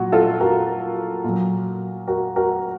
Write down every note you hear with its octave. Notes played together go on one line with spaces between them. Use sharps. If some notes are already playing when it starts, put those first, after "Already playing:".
Already playing: A#2 F#3 F#4
F4 A4
F#4 A#4
A#2 F#3
F#4 A#4
F#4 A#4